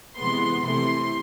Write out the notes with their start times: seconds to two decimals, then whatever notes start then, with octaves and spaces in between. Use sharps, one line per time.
0.17 C3 E3 G#3 B3 C6
0.62 C3 E3 A3 C6